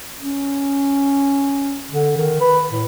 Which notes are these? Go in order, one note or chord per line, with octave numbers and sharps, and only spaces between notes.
C#4
D3
D#3
B4
A2